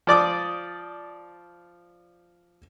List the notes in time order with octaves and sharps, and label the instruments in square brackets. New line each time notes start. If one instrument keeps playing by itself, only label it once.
[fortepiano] F3 D5 D6 D#6